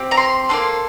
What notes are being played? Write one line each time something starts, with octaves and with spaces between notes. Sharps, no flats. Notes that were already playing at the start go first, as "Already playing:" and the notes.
Already playing: C4 G4
A#5
C6
A#3 D#4 A4 C6